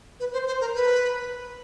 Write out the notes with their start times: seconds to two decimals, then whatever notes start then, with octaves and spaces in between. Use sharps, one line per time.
0.20 B4
0.33 C5
0.47 C5
0.61 A#4
0.75 B4